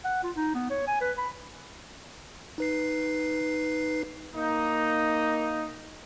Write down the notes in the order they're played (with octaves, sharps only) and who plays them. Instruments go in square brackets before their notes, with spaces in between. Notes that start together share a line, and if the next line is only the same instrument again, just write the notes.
[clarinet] F#5
F4
D#4
B3
C#5
G#5
B4
B5
[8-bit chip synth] D#4 B4 C7
[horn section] A#3 D#4